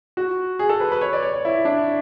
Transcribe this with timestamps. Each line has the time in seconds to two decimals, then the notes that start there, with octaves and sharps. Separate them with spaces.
0.17 F#4
0.59 G#4
0.69 A4
0.80 B4
0.92 B4
1.01 C#5
1.13 D5
1.22 C#5
1.34 C#5
1.45 E4
1.65 D4